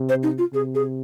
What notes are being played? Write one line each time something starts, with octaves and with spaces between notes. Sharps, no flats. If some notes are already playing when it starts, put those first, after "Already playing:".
Already playing: C3
C5
D#4
F4
C3 G#4
G#4